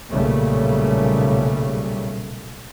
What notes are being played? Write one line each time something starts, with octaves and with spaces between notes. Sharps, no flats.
B1 A#2 C#3 G3 A3